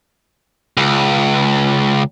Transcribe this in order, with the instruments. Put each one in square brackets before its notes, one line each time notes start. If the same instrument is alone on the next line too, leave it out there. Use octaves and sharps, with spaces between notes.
[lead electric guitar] C#2